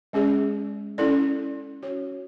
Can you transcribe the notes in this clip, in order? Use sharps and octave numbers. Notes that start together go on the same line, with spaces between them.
G#3 C#4 G#4 D5
C#4 E4 A4 D5
C#4 F#4 C#5